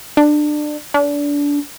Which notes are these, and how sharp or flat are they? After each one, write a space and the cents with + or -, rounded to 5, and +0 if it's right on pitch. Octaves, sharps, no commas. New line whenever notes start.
D4 +25
D4 -25